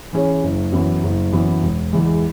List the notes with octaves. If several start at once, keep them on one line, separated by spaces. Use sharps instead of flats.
E3 C#4 G#4 C#5
F#1
F#2 E3 B3
F#1
F#2 E3 B3
E1
E2 E3 G#3